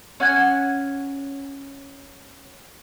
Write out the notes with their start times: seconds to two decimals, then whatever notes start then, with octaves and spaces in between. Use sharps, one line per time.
0.20 C#4 F#5 G#5